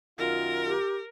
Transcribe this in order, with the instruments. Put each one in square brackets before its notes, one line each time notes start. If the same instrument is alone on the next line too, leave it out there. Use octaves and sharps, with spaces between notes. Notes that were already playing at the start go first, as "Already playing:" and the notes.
[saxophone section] F#2 D#3 F4 [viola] A#4
[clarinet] G4